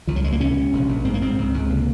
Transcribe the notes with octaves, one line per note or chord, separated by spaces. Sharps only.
C#2 F3
F#3
C#2 G#3
A#3
C3 C#4
C3
A#1
A#1
G#2 C4
A#3
G#2 C4
C#2
C#2
C3 A#3